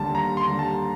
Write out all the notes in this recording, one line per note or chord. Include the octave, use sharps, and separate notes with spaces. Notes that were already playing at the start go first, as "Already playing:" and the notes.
Already playing: D#2 D3 G3 A5
D#2 A#5
C6
D3 G3
A5